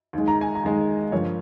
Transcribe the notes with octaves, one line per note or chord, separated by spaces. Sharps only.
D#2 D#3 G#3
A#5
G#5
A#5
D#2 D#3 G#3
G2 F3 A#3 C#5